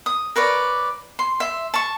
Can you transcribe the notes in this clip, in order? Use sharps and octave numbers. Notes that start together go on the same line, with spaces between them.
D#6
A#4 B4 C#5 D5
C6
E5 C6
A5 C#6